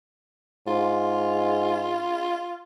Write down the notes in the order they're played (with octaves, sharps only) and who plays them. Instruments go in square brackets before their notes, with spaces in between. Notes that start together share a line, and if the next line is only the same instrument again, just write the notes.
[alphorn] G#2 [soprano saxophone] F4